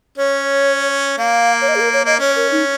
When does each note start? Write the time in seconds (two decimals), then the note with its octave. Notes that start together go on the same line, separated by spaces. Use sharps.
0.18 C#4 C#5
1.18 A#3 F5
1.61 C#5
1.68 D#5
1.75 G#4
1.80 A#4
1.93 C#5
2.05 A#3 D#5
2.19 C#4 C#5
2.36 A#4
2.52 D#4